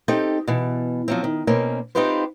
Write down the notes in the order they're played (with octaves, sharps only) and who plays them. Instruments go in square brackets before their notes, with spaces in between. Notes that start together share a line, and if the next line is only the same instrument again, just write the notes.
[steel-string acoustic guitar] C4 D#4 G4 A4
B2 E3
F3 F#3 C4
D#3
B2 A#3 C4 C#4
C4 D#4 F4 G4 B4 C5